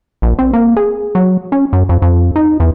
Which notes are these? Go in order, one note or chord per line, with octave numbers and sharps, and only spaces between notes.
A#1
C4
A#3
G#4
F#3
C#4
F#2
F2
F2
D#4
E2